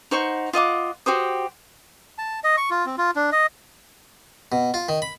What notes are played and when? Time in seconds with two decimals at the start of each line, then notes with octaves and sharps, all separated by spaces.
0.11 D#4 C5 F#5 C#6
0.53 F4 D#5 F#5 D6
1.06 F#4 G4 C5 D#6
2.18 A5
2.44 D#5
2.57 C#6
2.71 F4
2.86 C4
2.98 F4
3.16 D4
3.32 D#5
4.52 B2
4.74 F4
4.89 D#3
5.02 B5